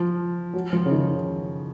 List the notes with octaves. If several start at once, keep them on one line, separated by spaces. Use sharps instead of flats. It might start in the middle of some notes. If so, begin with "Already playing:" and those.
Already playing: F3
F#3
F3
C#3
D#3